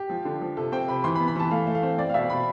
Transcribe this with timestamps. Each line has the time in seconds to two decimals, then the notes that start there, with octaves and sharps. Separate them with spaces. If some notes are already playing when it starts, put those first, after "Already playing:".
Already playing: G4
0.10 F3
0.25 D3
0.41 F3
0.57 C3 A4
0.72 C4 G5
0.88 C3 B5
1.04 E3 C6
1.15 B5
1.20 B3
1.28 B5
1.36 E3 A5
1.51 A3 F5
1.67 A3
1.75 F5
1.83 C4
1.98 C4 D5
2.09 F5
2.14 B2 E5
2.30 B2 B5